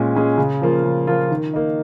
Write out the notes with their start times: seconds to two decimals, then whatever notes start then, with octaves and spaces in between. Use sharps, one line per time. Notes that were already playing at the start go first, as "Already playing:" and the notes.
Already playing: A#2 G#3 C#4 G#4
0.15 G#3 C#4 G#4
0.38 C#3
0.62 F3 A#3 F4
0.84 C#3
1.07 F3 A#3 F4
1.31 D#3
1.54 A#3 D#4